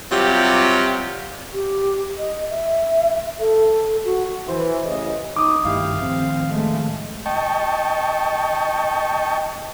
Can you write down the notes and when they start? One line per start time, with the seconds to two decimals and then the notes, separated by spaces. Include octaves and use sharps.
0.11 C3 F#3 G3 F4 G4
1.53 G4
2.18 D#5
2.50 E5
3.40 A4
4.05 F#4
4.48 E3 C5
4.84 A1 C#3 D#5
5.36 D#4 D6 D#6
5.65 G2 D#3 A3 E4 G4 F5
5.99 A2 D#3 F3 C4
6.49 G#3 A3
7.26 D#5 G5 A5 C#6